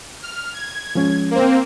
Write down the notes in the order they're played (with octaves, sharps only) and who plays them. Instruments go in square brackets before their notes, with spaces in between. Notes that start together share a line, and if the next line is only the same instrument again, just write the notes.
[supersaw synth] F6
G#6
[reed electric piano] F3 G#3 C#4
[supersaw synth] A#3 C4